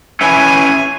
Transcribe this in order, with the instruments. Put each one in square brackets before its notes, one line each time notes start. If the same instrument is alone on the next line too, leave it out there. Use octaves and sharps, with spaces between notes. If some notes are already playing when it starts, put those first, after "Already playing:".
[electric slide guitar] C#4 E4 B4 [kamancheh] G#5